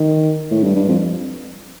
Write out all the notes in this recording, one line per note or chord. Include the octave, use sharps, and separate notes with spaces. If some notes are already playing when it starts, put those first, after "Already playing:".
Already playing: D#3
A2
G2
G2
F2